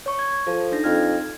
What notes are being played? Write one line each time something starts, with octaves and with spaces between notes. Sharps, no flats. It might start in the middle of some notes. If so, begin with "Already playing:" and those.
C#5 C#6
G#6
F3 A4
D4 D#4 A#6
F2 F6 G#6